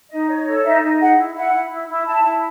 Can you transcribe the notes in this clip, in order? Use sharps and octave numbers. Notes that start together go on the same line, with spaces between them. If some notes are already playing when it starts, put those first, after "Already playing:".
D#4 D#5
C#5
A4
D#4 E5
D#4
G#4 F#5
E4
E4 F#5
E4
E4
E4
E4 A5
E4